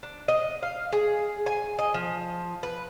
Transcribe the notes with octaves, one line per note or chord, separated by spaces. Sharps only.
D4
D#5
F5
G#4
G#5
D#5
F3
B4